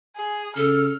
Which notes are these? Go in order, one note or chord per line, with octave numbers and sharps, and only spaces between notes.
G#4
C#3 A4 F6